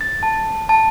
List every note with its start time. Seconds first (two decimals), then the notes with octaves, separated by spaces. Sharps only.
0.01 A6
0.23 A5
0.69 A5